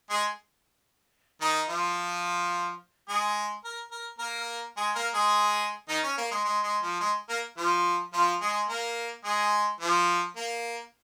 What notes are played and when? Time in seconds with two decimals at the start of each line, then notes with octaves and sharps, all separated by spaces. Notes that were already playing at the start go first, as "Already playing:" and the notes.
0.10 G#3 G#4
1.41 D#3 D#4
1.69 F3 F4
3.09 G#3 G#4
3.65 A#4
3.92 A#4
4.19 A#3 A#4
4.77 G#3 G#4
4.95 A#3 A#4
5.14 G#3 G#4
5.88 D#3 D#4
6.04 C#4
6.18 A#3
6.31 G#3
6.45 G#3
6.63 G#3
6.83 F3
7.00 G#3
7.29 A#3 A#4
7.57 F3 F4
8.13 F3 F4
8.41 G#3 G#4
8.69 A#3 A#4
9.24 G#3 G#4
9.81 F3
10.37 A#3